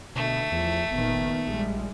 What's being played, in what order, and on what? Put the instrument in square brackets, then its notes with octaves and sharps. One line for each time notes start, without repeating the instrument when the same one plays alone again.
[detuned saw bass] B2 [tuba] D3 [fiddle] A3
[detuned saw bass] E2 [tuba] F3
[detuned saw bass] F#1 [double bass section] A#2 D#3 [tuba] B3
[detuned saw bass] A#1 [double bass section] G3 G#3